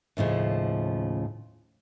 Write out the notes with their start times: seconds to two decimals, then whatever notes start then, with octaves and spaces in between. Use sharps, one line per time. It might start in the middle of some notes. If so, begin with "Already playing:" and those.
0.17 D#2 A2 C#3 F3